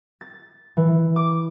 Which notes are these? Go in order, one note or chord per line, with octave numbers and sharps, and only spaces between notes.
A6
E3
D6